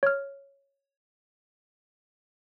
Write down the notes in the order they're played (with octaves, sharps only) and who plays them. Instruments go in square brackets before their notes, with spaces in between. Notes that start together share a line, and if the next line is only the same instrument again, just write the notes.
[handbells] C#5 F6